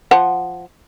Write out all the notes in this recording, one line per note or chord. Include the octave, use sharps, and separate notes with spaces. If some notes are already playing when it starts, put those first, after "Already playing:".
F3 C5 F#5